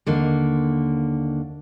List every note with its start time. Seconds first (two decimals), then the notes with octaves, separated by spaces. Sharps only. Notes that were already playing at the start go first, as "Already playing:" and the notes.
0.06 D#2 D3 A#3